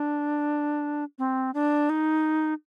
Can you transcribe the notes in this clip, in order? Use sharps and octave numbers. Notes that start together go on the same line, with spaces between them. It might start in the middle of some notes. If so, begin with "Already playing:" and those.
Already playing: D4
C4
D4
D#4